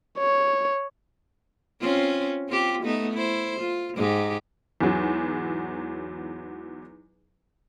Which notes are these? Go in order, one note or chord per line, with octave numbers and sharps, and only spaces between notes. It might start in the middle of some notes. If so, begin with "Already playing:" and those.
C#5
C4 C#4 F4
C4 F4 G4
A3 B3 D#4
E4 C5
F4
G#2 D#4 G4
E2 G#2 F#3